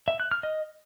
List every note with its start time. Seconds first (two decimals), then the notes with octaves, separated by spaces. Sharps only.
0.08 E5
0.20 F#6
0.31 F6
0.43 D#5